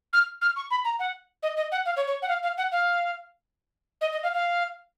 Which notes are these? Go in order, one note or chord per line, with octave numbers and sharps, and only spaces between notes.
F6
F6
C#6
B5
A#5
F#5
D#5
D#5
F#5
F5
C#5
C#5
F#5
F5
F5
F#5
F5
D#5
D#5
F5
F5